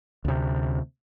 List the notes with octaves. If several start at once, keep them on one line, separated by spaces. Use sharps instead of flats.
D2 C3